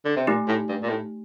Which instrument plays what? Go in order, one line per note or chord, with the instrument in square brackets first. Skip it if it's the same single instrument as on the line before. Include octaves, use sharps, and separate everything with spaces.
[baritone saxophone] D3
C3
[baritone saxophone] A#2 [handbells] A3 D#4 G4
[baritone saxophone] A2
G2
A#2
A2